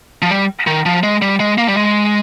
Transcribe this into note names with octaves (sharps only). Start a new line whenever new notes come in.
F3
G3
D#3
F3
G#3
G3
G#3
A#3
G3
G#3